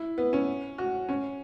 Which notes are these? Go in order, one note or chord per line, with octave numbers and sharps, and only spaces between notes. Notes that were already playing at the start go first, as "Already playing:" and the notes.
Already playing: E4
B3
C#4
F#4
C#4